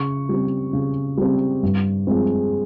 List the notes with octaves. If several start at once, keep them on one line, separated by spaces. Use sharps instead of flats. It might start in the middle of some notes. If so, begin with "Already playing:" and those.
Already playing: C#3 C#6
G3 C4
C#3
G3 C4
G2
F3 G#3 C4